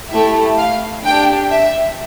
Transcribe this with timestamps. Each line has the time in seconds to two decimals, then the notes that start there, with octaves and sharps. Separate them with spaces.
0.09 A3 E4 G4 E5
0.56 F5
1.04 D4 G4 G5
1.50 E5